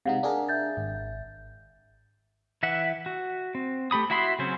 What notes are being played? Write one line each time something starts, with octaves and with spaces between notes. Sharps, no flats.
C3 G#3 D#4 F5 F#5
D4 G#4 A#4
E5 G6 A6
G#1
E3 E5 F#5
F#4
C4
A3 G4 B5 D#6
E4 F#4 E5 B5 C6
C#3 F#3 C4 C#4 C5